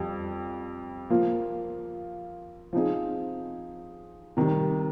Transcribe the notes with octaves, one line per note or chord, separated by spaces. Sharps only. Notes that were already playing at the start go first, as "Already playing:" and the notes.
Already playing: F2 G3
F3 A#3 F4
F3 C4 D#4 G#4
C3 D#3 G3